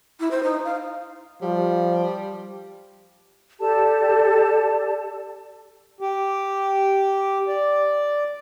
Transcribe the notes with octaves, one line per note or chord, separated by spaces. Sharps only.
E4
C5
D#4
F5
F3 G3
G4 A4 D5 A5
G4
D5